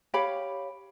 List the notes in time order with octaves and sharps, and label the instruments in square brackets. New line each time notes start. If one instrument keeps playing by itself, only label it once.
[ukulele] G4 C#5 F5 B5